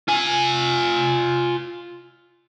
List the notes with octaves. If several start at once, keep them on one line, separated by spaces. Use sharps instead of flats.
F4 G#5